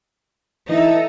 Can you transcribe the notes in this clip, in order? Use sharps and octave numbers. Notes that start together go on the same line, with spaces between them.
E3 D#4 A4 D#5 E5